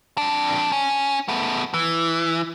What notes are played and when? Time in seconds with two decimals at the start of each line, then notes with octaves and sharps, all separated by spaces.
0.18 F2 D4
0.72 C#4
1.28 A3 B3
1.74 E3